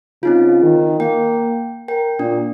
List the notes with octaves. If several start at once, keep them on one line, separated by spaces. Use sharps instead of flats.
C#3 C4 D#4 F4
D#3
A#3 G5
A#4 G5
A#2 D4